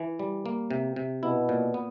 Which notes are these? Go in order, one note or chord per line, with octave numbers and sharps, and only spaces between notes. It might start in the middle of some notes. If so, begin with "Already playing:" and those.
Already playing: E3
G3
A#3
C3
C3
B2 E4
A#2
B3